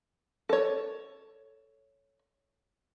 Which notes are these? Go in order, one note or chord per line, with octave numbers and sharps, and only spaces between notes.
A4 C#5